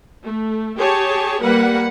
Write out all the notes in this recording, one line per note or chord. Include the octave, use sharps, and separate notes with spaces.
A3
G4 G#4 C#5 A5
G3 A#3 B4 F#5